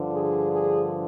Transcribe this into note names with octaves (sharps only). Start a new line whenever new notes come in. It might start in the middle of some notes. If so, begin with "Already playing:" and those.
Already playing: G2 D3 F3
G#4
G#4